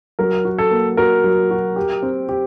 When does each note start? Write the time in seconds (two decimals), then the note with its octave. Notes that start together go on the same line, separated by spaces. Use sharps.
0.19 F#3 A#4
0.45 F#4
0.58 A4
0.71 A#3
0.97 F#4 A#4
1.24 F#3
1.51 F#4
1.76 G4
2.02 C4
2.29 G4